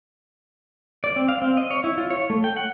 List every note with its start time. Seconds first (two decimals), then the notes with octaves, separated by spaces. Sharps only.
1.04 D5
1.16 C4
1.29 F5
1.42 C4
1.57 D#5
1.71 C#5
1.84 E4
1.98 F4
2.10 C#5
2.30 A3
2.44 G5
2.56 F#5